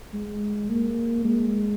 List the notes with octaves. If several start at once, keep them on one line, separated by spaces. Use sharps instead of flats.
G#3
A#3
G#3